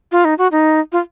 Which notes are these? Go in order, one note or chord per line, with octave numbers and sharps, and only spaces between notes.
F4
D#4
F#4
D#4
F4